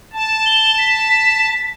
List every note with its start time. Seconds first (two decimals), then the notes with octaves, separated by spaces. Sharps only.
0.13 A5
0.46 G7
0.78 B6